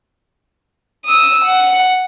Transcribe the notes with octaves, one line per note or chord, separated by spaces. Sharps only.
D#6 E6
F#5